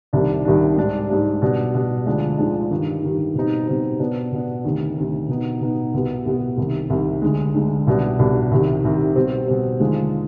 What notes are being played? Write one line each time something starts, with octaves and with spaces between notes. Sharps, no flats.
C2 C3 D#3 G3 D4
C2 C3 D#3 G3 D4
G#2 G3 D4
G#2 G3 D4
B2 G3 D4
B2 G3 D4
D2 D3 F3 G#3 D4
D2 D3 F3 G#3 D4
G2 D#3 G3
G2 D#3 G3
B2 G3 C4 D#4
B2 G3 C4 D#4
B2 B3 D4
B2 B3 D4
D2 C3 D#3
D2 C3 D#3
B2 B3 D#4
B2 B3 D#4
C2 B2 G3 B3
C2 B2 G3 B3
C2 C3 D#3
C2 C3 D#3
D2 D3 G#3
D2 D3 G#3
C2 B2 G3 D4
C2 B2 G3 D4
C2 C3 D#3 G3
C2 C3 D#3 G3
B2 G3 C4
B2 G3 C4
D#2 D3 F3 G#3